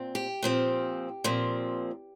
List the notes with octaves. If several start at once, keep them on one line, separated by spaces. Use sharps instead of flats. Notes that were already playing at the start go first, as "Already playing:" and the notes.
Already playing: A#2 C4
G4
A#2 F3 C4
A#2 F3 C4